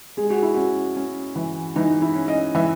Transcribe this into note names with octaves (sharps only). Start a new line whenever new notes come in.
G#3 G#4
F#4
E4
C#4 F#4
C#4
E3
E3 D#4
E4
C#4
D#5
E3 E5